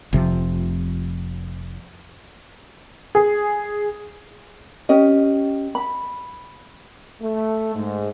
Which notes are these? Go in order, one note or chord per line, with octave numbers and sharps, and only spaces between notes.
F1 C3 F3
G#4
C#4 G4 D#5
B5
A3
G#2